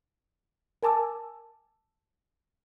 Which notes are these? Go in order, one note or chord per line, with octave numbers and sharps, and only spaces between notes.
A#4 G#5 A5 D6 E6